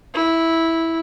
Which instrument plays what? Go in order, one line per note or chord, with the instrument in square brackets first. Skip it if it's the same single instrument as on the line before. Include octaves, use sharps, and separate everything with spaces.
[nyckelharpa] E4